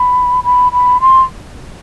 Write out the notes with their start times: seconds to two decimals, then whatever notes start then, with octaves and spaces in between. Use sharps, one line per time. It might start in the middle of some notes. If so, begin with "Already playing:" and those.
Already playing: B5
0.44 B5
0.72 B5
1.01 C6